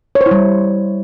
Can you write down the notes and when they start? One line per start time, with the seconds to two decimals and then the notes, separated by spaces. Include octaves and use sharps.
0.15 C#5
0.21 C5
0.26 E4
0.31 G3